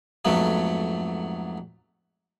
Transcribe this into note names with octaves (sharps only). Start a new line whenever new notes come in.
F2 G#2 F#3 A3 B3